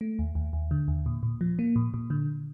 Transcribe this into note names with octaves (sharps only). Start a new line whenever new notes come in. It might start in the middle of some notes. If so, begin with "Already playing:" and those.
A3
D#2
D#2
D#2
D3
D#2
A#2
A#2
F3
A#3
A#2
A#2
D3